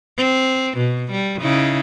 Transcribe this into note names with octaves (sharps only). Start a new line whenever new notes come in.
C4
B2
G3
C#3 D#4 E4